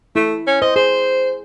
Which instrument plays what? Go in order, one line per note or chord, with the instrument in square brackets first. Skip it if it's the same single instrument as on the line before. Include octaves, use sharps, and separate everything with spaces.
[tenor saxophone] A3 [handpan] E4
[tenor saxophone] C#4
[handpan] C5 [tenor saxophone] D#5
[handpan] G#4 [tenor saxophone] C5